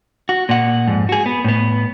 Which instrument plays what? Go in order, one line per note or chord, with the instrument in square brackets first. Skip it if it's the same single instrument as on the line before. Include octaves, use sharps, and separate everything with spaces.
[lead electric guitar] F#4
A#2 F#5
F2 G#2
F#4 G#4
B3
A2 B3